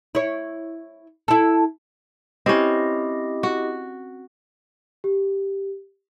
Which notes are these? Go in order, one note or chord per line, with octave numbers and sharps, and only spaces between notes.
E4 C#5
E4 A4
C4 C#4 E4 G4 D#5
F#4
G4